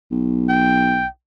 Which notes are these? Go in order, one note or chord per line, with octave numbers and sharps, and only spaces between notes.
B1
G5